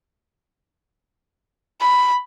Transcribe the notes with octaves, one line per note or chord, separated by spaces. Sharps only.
B5